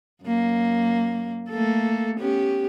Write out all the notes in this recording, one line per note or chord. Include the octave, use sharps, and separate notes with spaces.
F#2 A#3
A3 A#3 A4
B3 C#4 G4